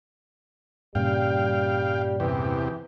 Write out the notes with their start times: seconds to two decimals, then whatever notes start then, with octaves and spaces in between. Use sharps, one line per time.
0.95 G2 A#2 C#3 G3 F5 G5
2.20 E2 C3 E3 G4